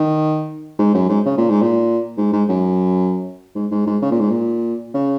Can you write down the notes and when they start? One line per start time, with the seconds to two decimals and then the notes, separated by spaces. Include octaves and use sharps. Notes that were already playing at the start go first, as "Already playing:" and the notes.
Already playing: D#3
0.79 G#2
0.94 F#2
1.09 G#2
1.26 C#3
1.38 A#2
1.50 G#2
1.62 A#2
2.18 G#2
2.33 G#2
2.48 F#2
3.55 G#2
3.71 G#2
3.86 G#2
4.02 C#3
4.11 A#2
4.20 G#2
4.31 A#2
4.94 C#3